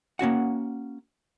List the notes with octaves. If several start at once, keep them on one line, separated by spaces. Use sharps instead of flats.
A#3 C#4 F#4 F#5